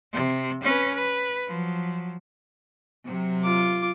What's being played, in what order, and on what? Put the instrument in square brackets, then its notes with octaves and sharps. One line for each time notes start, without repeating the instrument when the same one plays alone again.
[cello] C3
C#4 B4
B4
F3 F#3
[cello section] C3 F#3
[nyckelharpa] F4 D6